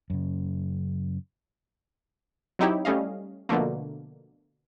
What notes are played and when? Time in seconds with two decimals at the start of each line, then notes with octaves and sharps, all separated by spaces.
0.10 F#2 C#3
2.59 F#3 C4 D#4 E4 G4 C#5
2.85 G3 A3 C#4 D#5 F5
3.49 B2 D3 F3 A3 A#3